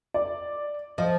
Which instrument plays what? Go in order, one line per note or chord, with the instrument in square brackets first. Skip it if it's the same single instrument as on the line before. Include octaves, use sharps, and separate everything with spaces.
[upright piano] D5
[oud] F3 [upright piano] D#5